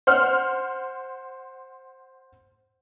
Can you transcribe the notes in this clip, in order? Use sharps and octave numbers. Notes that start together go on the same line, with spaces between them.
C5 F#5 F6